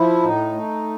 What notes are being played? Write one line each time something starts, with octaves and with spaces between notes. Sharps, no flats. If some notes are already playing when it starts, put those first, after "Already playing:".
Already playing: F3 E4
A2 D#4
A3